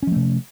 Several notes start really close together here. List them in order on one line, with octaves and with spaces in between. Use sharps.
C#4 F3 A3 C3